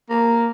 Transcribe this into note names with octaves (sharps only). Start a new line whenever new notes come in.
A#3